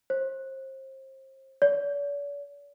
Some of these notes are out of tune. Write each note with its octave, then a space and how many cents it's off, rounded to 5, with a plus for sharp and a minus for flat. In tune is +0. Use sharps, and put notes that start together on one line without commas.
C5 +30
D5 -45